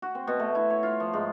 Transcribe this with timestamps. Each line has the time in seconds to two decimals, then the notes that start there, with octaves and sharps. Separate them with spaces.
0.02 F#4
0.15 C4
0.27 B2
0.40 A3
0.55 E4
0.70 C#5
0.83 F4
1.00 F3
1.13 G#2